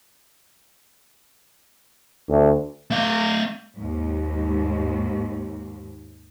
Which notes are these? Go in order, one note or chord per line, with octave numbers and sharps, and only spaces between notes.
D2
A3 F5
D#2 G#2